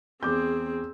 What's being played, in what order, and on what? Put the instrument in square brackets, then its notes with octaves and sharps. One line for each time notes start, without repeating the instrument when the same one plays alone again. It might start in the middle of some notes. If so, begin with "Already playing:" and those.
[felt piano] E2 D6 G6 [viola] C4 G#4